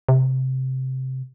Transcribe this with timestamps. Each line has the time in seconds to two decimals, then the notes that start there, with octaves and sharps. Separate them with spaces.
0.09 C3